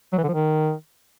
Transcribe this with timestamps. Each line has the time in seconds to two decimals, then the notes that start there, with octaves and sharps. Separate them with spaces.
0.13 F#3
0.18 E3
0.23 D3
0.29 F3
0.34 D#3